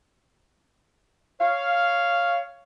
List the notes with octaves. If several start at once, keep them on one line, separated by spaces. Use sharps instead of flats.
C#5 F5